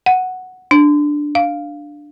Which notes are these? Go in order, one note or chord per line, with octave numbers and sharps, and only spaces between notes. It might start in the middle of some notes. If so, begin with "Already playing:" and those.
F#5
D4
F5